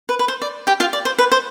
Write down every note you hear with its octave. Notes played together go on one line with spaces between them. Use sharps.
B4
B4
C5
D5
G4 G5
F4 F5
D5
C5
B4
C5